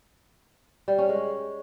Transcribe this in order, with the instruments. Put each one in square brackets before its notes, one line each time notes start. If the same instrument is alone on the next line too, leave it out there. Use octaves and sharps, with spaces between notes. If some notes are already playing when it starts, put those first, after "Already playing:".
[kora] G3
C#4
G#3